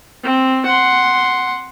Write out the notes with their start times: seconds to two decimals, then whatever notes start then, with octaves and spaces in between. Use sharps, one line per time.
0.24 C4
0.66 F#5 C6